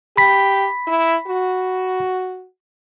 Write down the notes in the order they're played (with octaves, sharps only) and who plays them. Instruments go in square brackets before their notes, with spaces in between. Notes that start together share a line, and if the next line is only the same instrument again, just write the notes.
[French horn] G4 [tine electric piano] B5 B6
[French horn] E4
F#4